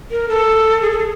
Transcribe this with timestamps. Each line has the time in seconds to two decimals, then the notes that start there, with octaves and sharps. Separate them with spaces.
0.11 A#4
0.28 A4
0.81 G#4
0.90 A4
0.98 G#4